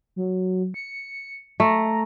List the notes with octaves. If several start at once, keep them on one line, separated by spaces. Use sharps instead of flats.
F#3
C#7
A3 A#5